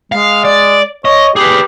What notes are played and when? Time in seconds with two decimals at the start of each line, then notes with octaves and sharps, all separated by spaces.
0.12 G#3 F5
0.45 D5
1.05 C#5 D#5
1.36 G4 G#4 B4